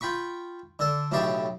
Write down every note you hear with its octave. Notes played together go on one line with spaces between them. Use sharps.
F4 G5 B5 C#6
D3 A4
B1 A2 C#3 G4 C#5 A5